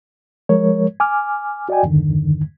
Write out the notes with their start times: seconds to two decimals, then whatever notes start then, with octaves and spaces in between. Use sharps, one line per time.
0.49 F3 G#3 A#4 C#5
1.00 G#5 D6 F6
1.69 F#4 D5 D#5 G5 G#5
1.83 E2 G2 D3 D#3